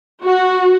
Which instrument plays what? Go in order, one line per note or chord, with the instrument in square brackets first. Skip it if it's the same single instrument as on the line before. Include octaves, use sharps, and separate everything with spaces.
[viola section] F#4